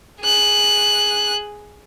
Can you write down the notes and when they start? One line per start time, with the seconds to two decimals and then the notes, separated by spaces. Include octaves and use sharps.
0.21 G#4 F#6